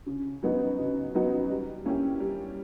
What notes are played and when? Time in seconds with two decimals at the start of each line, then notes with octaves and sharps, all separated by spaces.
0.06 C#3
0.43 F#3 B3 D#4 F#4
0.79 C#3
1.15 F#3 B3 D#4 F#4
1.49 G3
1.85 A#3 C#4 E4 G4
2.20 G3